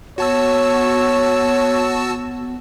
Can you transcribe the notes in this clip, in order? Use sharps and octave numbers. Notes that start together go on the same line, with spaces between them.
B3 F#4 C#5 A5 E6